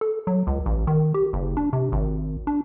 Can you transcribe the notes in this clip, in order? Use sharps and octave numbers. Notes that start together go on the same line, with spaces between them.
A4
F#3
C#2
A1
D#3
G4
F#1
D4
C3
G#1
D4